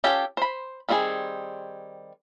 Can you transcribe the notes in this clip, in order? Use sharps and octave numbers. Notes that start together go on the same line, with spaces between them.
C#4 F4 G4 A4 A5
C5 B5
D#3 G3 C4 F4 G#4